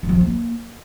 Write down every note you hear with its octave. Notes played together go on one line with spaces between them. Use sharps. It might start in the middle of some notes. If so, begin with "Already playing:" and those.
D#3
F3
F4
A#3